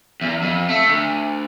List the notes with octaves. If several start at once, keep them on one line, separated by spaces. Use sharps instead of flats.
E2
F2
A3
D2